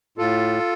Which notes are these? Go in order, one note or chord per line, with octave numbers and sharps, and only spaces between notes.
A2 F4 A4